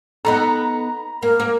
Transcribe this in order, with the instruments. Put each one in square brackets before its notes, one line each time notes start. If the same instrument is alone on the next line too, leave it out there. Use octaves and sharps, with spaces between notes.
[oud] B3 D#4 A4 [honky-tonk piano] A#5 B5
[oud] A#3 [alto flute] A#4
[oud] A#3